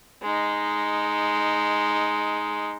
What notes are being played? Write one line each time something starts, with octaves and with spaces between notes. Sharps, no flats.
G#3 D#4